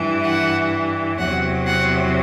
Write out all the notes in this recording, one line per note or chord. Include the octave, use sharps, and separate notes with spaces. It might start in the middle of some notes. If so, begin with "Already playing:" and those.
Already playing: G2 E3
F#5
E2 C3 F#3 F#5
F#5